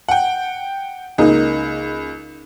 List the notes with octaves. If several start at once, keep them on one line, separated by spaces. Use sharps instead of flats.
F#5 G5
C#2 A#3 D#4 G#4